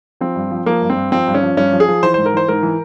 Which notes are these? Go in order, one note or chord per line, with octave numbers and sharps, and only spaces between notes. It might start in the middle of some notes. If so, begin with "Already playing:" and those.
F3 C4
G2
F3
F3 A#3
G2
C4
G2
F3 C4
G2
C#4
F3
G2 C#4
F3
G#4
F3
E3 C5
G#2 C5
A#4
E3 C5
G#2 A#4
E3